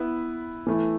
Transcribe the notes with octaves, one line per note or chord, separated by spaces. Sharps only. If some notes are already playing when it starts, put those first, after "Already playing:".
Already playing: B3 E4 B4
E3 A3 E4